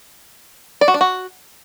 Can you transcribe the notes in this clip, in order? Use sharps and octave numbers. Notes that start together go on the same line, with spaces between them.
D5
F#4
D4
F#4